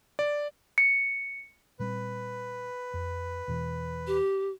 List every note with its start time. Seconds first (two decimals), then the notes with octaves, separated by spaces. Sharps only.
0.19 D5
0.78 C#7
1.79 A#2 G3 C4 B4
2.94 F2
3.48 E2 B2 E3
4.07 G4